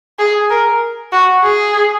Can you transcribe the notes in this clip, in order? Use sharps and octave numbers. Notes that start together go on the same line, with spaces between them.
G#4
A#4
F#4
G#4